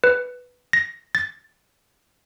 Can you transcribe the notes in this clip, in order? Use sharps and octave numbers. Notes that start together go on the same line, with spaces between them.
B4
A#6
A6